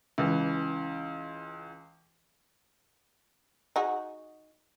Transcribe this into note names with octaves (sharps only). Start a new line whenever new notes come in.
C#2 E3
D#4 F#4 G#4